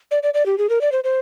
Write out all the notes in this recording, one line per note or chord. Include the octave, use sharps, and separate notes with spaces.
D5
D5
D5
G4
G#4
A#4
D5
C5
C5